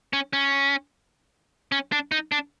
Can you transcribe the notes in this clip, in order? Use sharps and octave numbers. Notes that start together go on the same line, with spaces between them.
C#4
C#4
C#4
D4
D#4
D4